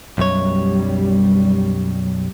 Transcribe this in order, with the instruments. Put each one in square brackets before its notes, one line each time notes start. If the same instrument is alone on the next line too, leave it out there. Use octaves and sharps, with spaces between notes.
[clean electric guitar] B1 F#2 C#5 [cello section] G3